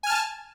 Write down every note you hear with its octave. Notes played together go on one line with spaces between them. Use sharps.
G#5 A5 F6